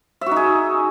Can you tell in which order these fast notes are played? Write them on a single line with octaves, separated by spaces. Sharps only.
E5 F#4 D#4 G#4